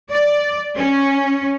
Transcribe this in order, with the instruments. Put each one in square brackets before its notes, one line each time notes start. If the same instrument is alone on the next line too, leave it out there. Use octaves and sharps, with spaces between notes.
[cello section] D5
C#4